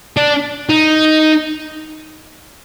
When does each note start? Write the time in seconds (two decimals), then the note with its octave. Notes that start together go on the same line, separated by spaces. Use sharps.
0.17 D4
0.69 D#4